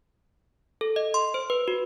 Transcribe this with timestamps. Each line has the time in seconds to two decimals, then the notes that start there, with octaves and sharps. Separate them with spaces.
0.81 A4
0.96 D#5
1.14 C6
1.34 C5
1.50 B4
1.68 F#4